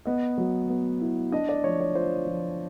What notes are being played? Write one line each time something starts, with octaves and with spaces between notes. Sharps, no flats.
B3 D#5
F#3
B3
E4
D4 D#5
D5
F3 C#5
C#5
F4 C5
F3